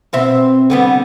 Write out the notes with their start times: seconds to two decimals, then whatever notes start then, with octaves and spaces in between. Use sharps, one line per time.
0.13 B2 C4 E5
0.70 D3 G3 B3